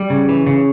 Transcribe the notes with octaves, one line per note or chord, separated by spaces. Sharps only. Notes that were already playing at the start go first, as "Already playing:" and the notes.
Already playing: G3
C#3
E3
C#3